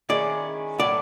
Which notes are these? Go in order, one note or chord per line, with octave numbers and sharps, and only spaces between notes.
D#3 G#3 C#4 E4 D5
A2 F#3 B3 D5